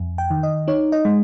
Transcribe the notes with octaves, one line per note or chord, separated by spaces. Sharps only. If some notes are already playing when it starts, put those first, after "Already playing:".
Already playing: F2
G5
D#3
D#5
D#4 C#5
D#5
G#3